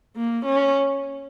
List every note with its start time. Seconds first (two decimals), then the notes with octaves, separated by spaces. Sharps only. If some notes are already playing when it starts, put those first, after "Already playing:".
0.16 A#3
0.46 C#4